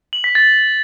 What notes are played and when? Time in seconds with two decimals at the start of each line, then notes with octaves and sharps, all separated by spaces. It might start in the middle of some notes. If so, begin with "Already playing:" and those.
0.13 F#7
0.24 B6
0.35 A6